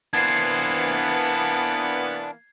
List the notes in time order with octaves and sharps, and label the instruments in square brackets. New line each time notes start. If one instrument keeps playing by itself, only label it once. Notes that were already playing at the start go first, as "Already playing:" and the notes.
[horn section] E3 A#3 B3 [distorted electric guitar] D4 C5 [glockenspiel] G#6 C7